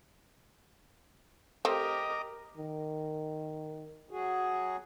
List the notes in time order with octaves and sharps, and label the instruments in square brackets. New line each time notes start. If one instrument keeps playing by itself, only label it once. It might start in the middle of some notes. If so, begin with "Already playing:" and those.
[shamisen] A3 C4 G5 [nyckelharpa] G4 A#4 [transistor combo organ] D#5 A#5 D6
[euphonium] D#3
[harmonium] F#3 F#4 G#4